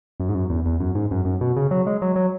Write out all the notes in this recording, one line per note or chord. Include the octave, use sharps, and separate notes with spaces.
F#2
G#2
F#2
E2
E2
F#2
G#2
F#2
F#2
B2
C#3
F#3
G#3
F#3
F#3